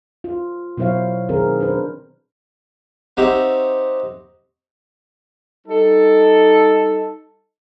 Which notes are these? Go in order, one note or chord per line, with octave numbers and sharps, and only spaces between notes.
F4
B2 F#3 E4 C5 C#5 F5
D#3 C4 G#4 A#4
D4 B4 C5
C4 D#4 F#4 G4 E5 F#5
G3 D#4 A4